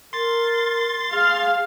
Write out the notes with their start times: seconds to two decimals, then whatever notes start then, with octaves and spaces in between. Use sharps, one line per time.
0.13 A#4 C6 A6
1.12 G#4 F5